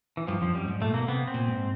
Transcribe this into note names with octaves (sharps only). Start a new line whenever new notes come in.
E3
G2 F3
F2 F3
F#2 G3
G#2
A#2 A3
B2 A#3
C3 B3
C4
A#2
G#2